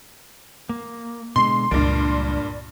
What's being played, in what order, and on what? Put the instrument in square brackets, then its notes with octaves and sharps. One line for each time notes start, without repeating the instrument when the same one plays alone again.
[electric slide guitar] A#3
[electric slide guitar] B2 D3 G#3 [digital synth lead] C6
[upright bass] C#2 [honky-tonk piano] G2 A#2 [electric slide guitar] D5